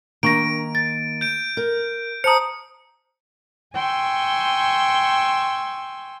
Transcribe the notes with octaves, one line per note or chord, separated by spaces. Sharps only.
D#3 A#3 D4 A#5 C#6 A#6 D7
A6
G6 D7
A#4
C5 A5 A#5 D#6 C#7
G5 G#5 C6 C#6 E6